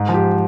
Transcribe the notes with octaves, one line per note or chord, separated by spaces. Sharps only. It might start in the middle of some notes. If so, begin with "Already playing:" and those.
Already playing: G#2
F3
G4